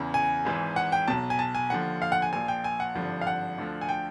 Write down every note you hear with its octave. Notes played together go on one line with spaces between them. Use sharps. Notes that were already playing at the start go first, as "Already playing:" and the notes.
Already playing: E2 C#3 E3
G#5
G#1 G#2 E3
F#5
G5
B1 B2 A5
G#5
A5
G#5
D#2 D3 F3 F#5
F5
F#5
G#5
A#1 A#2 F3 G#5
G5
G#5
F#5
G#1 G2 D3 F3
F5
F#5
D2 D3 F3
G#5
G5